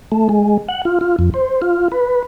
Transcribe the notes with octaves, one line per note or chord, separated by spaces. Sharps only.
A3
G#3
F#5
F4
F4
F2
C5
F4
B4